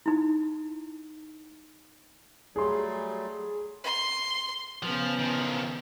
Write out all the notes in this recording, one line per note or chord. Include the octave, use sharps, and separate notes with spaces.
D#4 E4
F#3 G3 A3 G#4 C6
C6
C#3 F3 B3
D#3 F3